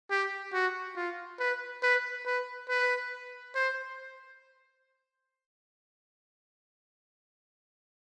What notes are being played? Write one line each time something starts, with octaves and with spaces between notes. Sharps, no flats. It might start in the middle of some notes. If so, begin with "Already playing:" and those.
G4
F#4
F4
B4
B4
B4
B4
C5